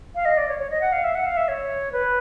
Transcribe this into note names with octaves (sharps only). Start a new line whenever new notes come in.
F5
D#5
D5
C#5
C#5
D#5
F#5
F5
E5
F#5
F5
E5
C#5
B4